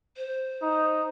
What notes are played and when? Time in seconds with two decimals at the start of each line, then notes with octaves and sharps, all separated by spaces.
0.17 C5
0.62 D#4